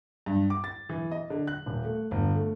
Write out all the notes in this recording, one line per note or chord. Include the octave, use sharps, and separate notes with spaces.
G2
D6
A6
E3
D#5
D3
F#6
D#1
A3
G1
A3